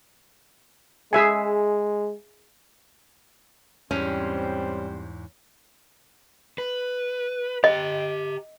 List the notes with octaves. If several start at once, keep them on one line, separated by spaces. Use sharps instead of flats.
G#3 G#4 E5 G#5
E2 G#2 G3 C4 C#4 C5
B4
G4 D#5 A#5